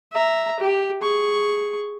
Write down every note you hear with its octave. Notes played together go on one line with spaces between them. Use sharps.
E5 A#5
G4
G#4 C#6